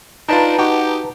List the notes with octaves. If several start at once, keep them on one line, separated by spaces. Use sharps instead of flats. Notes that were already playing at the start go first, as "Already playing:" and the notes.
D4 D#4 F4 B4 A5 A#5
D#4 F#4 G4